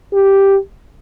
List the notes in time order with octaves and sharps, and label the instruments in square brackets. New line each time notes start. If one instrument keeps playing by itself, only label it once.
[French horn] G4